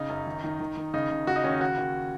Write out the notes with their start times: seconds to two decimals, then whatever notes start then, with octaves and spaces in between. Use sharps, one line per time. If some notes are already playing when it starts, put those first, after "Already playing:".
Already playing: C#3 D#4
0.09 F#2
0.26 D#3
0.44 D#3
0.60 D#3
0.77 D#3
0.93 C#3 D#4
1.10 C#3
1.27 C#3 F#4
1.36 D#4
1.44 D#2 C#4
1.52 D#4
1.61 D#2 F#4
1.78 D#2